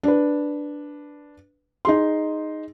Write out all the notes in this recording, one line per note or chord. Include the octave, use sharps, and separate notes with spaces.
D4 B4
D#4 G#4 C6